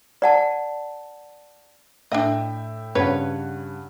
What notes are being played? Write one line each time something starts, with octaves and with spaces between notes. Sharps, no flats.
D5 F#5 A5
A2 D4 D#5 E5 G5
G2 C#3 C4 F4 B4 C#5 F#5